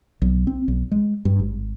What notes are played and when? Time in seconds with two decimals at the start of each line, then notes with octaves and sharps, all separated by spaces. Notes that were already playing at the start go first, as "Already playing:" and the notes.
0.22 B1
0.47 C4
0.68 B1
0.91 G#3
1.25 G2
1.39 G#1